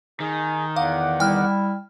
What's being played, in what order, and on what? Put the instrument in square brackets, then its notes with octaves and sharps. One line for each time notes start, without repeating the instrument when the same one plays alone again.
[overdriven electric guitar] D#3 [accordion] G#4
[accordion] E2 F#5 D6 [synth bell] F5
[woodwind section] G3 E4 [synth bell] G5 F6